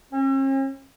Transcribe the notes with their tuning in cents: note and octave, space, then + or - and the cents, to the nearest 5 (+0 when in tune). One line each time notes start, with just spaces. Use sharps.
C#4 -45